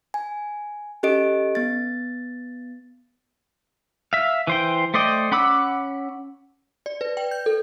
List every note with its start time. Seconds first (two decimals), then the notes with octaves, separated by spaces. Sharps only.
0.14 G#5
1.03 C#4 G4 A4 D#5 D7
1.55 B3 A6
4.13 E5 F5
4.47 E3 C5 G5
4.94 A3 C5 D5 D#5 G5
5.32 C#4 F#5 B5 D6 E6
6.86 D5
7.01 B4
7.17 G5
7.31 G6
7.46 A4